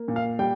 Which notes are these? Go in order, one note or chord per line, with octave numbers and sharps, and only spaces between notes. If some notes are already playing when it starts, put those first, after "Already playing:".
Already playing: A#3
A#2
F5
G3 G5